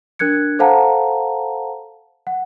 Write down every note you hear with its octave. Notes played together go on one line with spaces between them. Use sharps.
D4 A#4 F#6 G#6 C#7
A4 C5 F5 F#5 A5 A#5
F#5